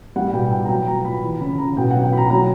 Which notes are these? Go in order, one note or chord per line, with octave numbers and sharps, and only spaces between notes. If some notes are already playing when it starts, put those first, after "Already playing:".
G3 F#5
B2 G5
B2 G5
A#5
F#3 G5
F#3 A#5
A#2 B5
E3 B5
C#3 B5
C#3 A#5
B2 G5
F#3 F#5
G5
B2 A#5 B5
F#3 A#5